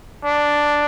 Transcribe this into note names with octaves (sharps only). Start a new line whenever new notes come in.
D4